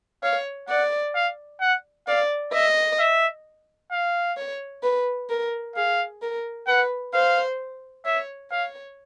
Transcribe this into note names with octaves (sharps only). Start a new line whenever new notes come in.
C#5 F5
D5 F#5
F5
F#5
D5 F5
D#5 E5
E5
F5
C#5
B4
A#4
G#4 F5
A#4
B4 F#5
C5 F5
C#5 E5
C#5 F5